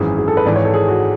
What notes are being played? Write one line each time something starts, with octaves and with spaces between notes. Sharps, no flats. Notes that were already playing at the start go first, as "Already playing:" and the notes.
Already playing: G#1 F#2 E3 G#4
G#4
A4
B4
G#1 G#2 E3 D5
C#5
A4
G#4
F#4